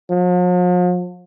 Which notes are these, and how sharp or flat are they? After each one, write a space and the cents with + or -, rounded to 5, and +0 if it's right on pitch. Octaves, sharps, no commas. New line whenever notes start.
F3 +45